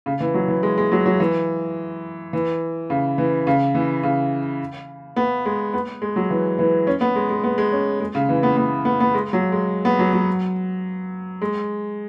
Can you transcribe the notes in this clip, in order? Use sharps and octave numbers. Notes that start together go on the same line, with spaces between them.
C#3
E3
F#3
E3
G#3
G#3
F#3
F#3
E3
E3
C#3
E3
C#3
E3
C#3
B3
G#3
B3
G#3
F#3
E3
E3
C#4
B3
G#3
G#3
B3
G#3
C#4
G#3
C#3
E3
B3
B3
B3
B3
G#3
F#3
G#3
B3
F#3
F#3
G#3